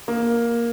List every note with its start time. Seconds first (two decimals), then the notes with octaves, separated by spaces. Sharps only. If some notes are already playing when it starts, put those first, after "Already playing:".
0.08 A#3